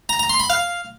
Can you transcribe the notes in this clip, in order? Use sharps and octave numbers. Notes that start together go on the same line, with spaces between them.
A#5
A#5
C6
B5
F5